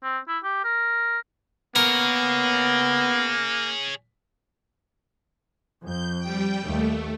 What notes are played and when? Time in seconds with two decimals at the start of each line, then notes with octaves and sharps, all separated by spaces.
0.03 C4
0.28 E4
0.44 G4
0.64 A#4
1.76 A#3 B3 G#4 A#4 C#5
5.85 F2 G6
6.19 G3 G5
6.63 D#2 A3